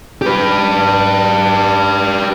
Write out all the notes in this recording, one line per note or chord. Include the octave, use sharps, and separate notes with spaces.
G4 B4